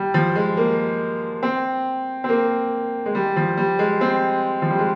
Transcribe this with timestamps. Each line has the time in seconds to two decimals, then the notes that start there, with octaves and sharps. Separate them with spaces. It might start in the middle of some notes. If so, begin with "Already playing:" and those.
Already playing: G3
0.14 F3
0.35 G#3
0.57 A#3
1.43 C4
2.24 C4
2.29 A#3
3.06 G#3
3.15 G3
3.36 F3
3.57 G3
3.79 G#3
4.01 C4
4.62 F3
4.71 G3
4.79 G#3